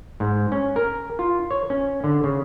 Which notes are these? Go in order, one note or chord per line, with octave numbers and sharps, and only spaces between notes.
G#2
C#4
A#4
F4
C#5
C#4
D3
C#3